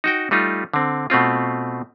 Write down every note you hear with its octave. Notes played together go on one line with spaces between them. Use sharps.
D#4 F#4 G5
G3 A3 D#4 F4
D3 C4
B2 A3 C4 F4